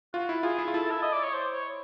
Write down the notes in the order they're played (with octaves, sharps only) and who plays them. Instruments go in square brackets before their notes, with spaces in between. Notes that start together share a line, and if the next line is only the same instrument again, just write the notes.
[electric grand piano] F4 [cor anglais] F#4
[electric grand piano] E4
[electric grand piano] F4 [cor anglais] G#4
[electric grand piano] E4
F4
[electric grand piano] E4 [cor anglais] A4
[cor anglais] E5
D#5
D5
C#5
C5
C#5